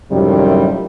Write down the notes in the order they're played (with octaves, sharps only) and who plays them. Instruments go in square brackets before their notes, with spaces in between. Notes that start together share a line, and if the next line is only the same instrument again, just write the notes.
[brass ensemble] F#2 A2 C3 D#3 F3 G3